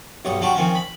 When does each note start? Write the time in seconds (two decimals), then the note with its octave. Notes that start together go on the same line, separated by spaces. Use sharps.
0.25 B1 G2 C#5
0.41 F#3 D4 F4 G4 C#6
0.55 D#3 F3 C4 C#4
0.75 B5